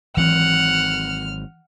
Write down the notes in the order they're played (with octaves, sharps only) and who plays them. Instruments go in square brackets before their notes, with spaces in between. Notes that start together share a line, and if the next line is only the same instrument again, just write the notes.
[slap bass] G#1 F#3 C4 [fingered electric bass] E3 [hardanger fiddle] F#5 [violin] F6